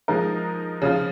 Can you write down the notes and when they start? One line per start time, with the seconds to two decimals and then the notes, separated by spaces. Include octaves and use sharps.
0.08 F3 G#3 D#4 A#4
0.82 C#3 F3 C#4 F4